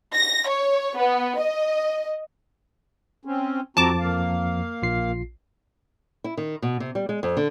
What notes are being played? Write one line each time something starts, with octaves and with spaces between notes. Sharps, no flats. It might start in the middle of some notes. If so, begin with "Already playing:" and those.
A#6
C#5
B3
D#5
C4 C#4
F2 F3 C4 F#4 A5 A#5 D6
A#3 F5
A#1 F4 C7
E4
D#3
B2
C3
G3
G#3
F2
D3